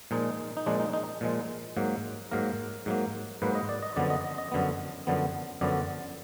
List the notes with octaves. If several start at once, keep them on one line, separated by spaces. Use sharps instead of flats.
A#2 F3 G#3 D#4
D#4
A#2 F3 G#3 D4
D#4
D#4
A#2 F3 G#3
G#2 F#3 A#3
G#2 F#3 A#3 A#4
G#2 F#3 A#3
G#2 F#3 A#3 B4
D#5
D5
D#5
F#2 D3 F3 B3 D5
D#5
D#5
D#5
F#2 D3 F3 B3
F#2 D3 F3 B3
F#2 D3 F3 B3 D5